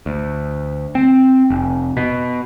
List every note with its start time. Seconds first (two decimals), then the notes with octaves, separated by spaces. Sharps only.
0.06 D2
0.95 C4
1.50 F1
1.97 B2